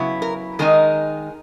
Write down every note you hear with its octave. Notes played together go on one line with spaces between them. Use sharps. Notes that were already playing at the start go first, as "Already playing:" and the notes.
Already playing: C#3 F#3 B3 E4
A#4
D#3 G#3 D#4 A#4